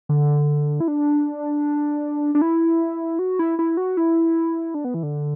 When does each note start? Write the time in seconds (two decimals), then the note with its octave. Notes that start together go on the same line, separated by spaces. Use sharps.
0.09 D3
0.80 E4
0.88 D4
2.35 D4
2.42 E4
3.19 F#4
3.39 E4
3.59 E4
3.77 F#4
3.97 E4
4.74 D4
4.84 B3
4.94 E3
5.03 D3